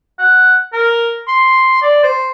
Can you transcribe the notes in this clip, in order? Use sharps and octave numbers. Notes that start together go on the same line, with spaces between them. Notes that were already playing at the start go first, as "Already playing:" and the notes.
F#5
A#4
C6
D5
C5